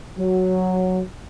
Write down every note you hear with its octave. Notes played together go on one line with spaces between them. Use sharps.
F#3